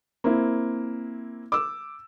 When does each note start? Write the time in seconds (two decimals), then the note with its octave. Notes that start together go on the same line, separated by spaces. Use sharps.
0.24 A#3 C4 E4
1.52 D6 E6